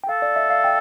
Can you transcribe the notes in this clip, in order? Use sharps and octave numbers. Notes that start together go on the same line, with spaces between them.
G5
A4 F5
D5
E5
F5
G5